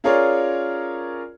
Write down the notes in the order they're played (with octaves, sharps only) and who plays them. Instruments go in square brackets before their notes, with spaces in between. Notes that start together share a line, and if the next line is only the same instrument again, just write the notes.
[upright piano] C#4 F4 G#4 A#4 C#5 D5